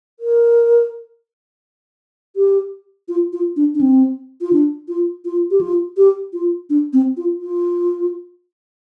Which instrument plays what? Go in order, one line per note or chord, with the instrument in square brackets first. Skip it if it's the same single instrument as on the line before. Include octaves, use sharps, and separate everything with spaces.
[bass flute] A#4
G4
F4
F4
D4
D4
C4
F4
D4
F4
F4
G4
F4
G4
F4
D4
C4
F4
F4